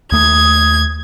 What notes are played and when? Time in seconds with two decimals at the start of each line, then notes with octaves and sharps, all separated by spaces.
0.12 D#2 A3 D#6 G#6